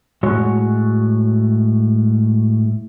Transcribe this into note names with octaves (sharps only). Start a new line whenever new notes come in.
A2 G#3 F#4 C#5